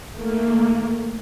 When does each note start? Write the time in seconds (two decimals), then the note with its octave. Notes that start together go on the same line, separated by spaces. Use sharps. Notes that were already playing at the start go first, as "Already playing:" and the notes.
0.15 D#3 A3 A#3